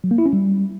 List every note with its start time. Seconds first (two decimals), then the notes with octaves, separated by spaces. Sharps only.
0.04 F#3
0.11 A#3
0.18 E4
0.26 C#4
0.33 G3